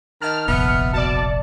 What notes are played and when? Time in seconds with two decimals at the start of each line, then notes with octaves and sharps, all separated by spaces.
0.21 D#3 D#5 A5 F6
0.48 F1 A#1 D#2 B3 E5 C#7
0.93 B2 D5 A5